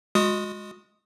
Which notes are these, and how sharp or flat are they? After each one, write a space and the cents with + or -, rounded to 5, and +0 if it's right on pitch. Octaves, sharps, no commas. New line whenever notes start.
G#3 -5 F#4 -35 D#6 +0